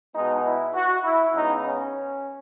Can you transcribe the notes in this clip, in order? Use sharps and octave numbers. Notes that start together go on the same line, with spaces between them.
B2 G#3 B3 D#4
E4
F#4
E4
C#3 G#3 B3 D#4
C#4